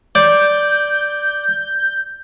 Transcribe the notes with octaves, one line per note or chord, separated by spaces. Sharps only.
D5 G6